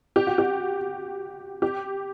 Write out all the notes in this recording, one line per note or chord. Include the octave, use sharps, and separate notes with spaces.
G4
F#4
G4
G4